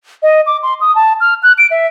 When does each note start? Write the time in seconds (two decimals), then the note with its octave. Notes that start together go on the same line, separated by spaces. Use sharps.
0.23 D#5
0.46 D6
0.63 C6
0.81 D#6
0.95 A5
1.21 F6
1.43 F#6
1.58 D7
1.71 E5